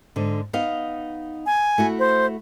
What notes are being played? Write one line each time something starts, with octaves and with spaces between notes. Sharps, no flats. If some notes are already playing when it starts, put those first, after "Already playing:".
G#2 D3
B3 D#4 F5
G#5
A3 E4 F#4
C5